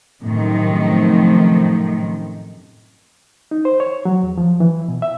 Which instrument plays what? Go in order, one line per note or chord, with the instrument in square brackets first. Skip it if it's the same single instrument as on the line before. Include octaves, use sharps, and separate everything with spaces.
[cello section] F#2 A2 C3 D#3 F3
[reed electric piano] D#4
C5
C#5
F#3
E2
F3
E3
B2
E5